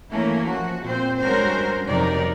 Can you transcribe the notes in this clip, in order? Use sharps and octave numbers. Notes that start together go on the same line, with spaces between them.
E3 A3 A#3 C#4 E4
F3 F#4
A#2 C4 C5
G2 G#3 C#4 F#4 A#4 C5
F2 C3 F#3 D#4 A#4 D5